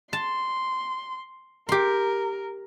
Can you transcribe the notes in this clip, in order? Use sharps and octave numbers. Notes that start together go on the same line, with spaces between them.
A5 C6
G4 A#4 C6